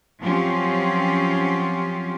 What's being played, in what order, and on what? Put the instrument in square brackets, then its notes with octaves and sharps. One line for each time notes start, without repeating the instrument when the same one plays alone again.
[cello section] F3 F#3 C4 C#4 F4 G4